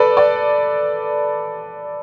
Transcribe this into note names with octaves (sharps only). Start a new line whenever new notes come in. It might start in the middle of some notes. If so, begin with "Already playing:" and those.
Already playing: A4 B4 D5
D5